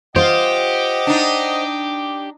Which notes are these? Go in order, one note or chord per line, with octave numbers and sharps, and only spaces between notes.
F4 G4 C5 D#5 F#5
D4 D#4